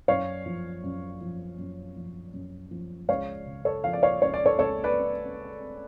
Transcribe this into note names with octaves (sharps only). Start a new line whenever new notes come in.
F#2 C#5 F5
F3
F#2
F3
F#2
F3
F#2
F3
C#2 C#5 F5
C#3
A4 C#5
F3 F5
D5
C#5 F5
C#2 C#5
D5
A4 C#5
C#2 A4 C#5
B4 D5